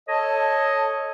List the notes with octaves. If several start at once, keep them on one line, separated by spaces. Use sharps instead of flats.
A4 C#5 D#5